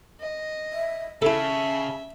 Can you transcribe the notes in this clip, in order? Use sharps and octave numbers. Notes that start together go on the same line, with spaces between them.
D#5
E5
C#3 E4 A4 E5 A5